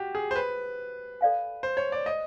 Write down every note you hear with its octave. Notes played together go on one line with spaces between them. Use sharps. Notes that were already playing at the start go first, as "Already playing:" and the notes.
Already playing: F#4 G4
G#4
C5
B4
A4 D5 F5 G#5
C5
C#5
D5
D#5